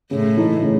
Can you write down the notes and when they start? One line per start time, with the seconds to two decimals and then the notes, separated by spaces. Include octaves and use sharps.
0.11 A2 C#3
0.37 E3 A3 D#4
0.63 C#3